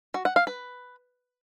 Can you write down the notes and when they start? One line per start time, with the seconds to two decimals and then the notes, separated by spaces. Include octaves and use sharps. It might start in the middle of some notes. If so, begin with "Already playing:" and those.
0.14 F#4
0.25 F#5
0.36 F5
0.47 B4